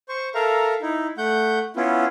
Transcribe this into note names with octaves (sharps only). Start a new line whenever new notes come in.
C5 C#6
A4 A#4 E5 F5 A#5
D#4 E4
A3 F#5 G6
B3 C#4 E4 F4